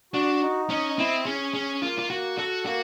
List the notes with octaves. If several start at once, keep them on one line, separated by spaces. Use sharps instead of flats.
D4 F#4
D#4
C#4 D#5
C4 E4
C#4 G#4
C#4 G#4
A#3 F4
F4
A#3 F#4
F#4 A4
A#3 F#4